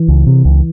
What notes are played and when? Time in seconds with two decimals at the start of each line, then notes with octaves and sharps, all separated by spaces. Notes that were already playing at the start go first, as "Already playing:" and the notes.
Already playing: E3
0.08 C#2
0.27 C3
0.45 C#2